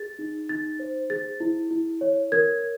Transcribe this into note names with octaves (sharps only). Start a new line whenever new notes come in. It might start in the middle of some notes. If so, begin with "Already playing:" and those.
Already playing: G#4 A6
D#4
D#4 A6
C5
G#4 A6
E4
E4
C#5
A#4 G#6